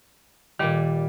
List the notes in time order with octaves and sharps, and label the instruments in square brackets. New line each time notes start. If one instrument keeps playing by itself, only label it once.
[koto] A#2 G3 [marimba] D#3